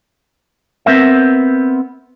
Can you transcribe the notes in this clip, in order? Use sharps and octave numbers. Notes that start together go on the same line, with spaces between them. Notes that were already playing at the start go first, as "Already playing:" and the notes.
B3 C4 A#4 E5